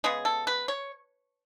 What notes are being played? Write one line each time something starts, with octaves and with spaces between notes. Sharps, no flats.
C#3 G#3 B3 G#4
A4
B4
C#5